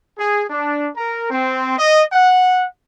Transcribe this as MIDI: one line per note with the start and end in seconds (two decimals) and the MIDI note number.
0.18 0.43 68
0.50 0.88 62
0.96 1.26 70
1.30 1.76 60
1.78 2.04 75
2.13 2.64 78